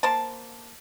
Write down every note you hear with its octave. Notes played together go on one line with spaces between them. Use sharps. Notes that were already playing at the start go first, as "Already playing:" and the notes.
A#3 C5 A5